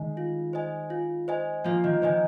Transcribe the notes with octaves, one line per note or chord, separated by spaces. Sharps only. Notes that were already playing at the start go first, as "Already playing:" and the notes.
Already playing: D#3 G#3
F4
C5 D#5 G#5
F4
C5 D#5 G#5
F3 A#3 F4
D#3
D#3 C5 D#5 G#5